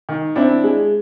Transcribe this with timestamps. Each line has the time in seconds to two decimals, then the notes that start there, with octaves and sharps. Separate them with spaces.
0.09 D#3
0.36 C4 D4 E4
0.63 G#3